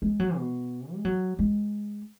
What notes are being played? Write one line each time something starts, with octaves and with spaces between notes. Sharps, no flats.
G#3
F#3
B2
G#3
F#3
G#3